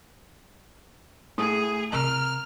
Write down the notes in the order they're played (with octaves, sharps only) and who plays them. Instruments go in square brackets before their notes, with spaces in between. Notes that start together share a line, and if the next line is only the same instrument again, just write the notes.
[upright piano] A2 D#6 [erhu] G#4
[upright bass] C3 [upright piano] A#4 [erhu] F6